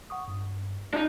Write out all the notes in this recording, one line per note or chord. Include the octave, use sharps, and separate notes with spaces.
F#5 C#6 D#6
G2
D4 D#4